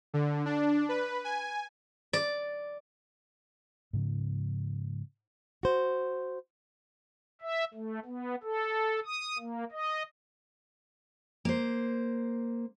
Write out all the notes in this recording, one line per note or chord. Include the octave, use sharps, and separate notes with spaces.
D3
D4
B4
G#5
D5
G#2 C#3 F3
F#4 C5
E5
A3
B3
A4
D#6
A#3
D#5
A#3 C5